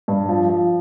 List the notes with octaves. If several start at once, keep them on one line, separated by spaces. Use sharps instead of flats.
G2
F3
F3